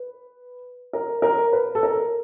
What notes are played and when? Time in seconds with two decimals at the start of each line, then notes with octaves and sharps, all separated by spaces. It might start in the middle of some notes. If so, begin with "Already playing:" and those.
Already playing: B4
0.93 A#4
1.22 A#4
1.53 B4
1.75 A4
1.83 A#4